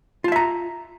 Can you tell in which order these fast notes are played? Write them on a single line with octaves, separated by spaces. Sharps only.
F4 A5 E5 A#5